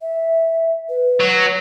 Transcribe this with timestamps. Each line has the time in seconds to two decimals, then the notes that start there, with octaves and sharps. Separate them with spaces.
0.02 E5
0.89 B4
1.20 F#3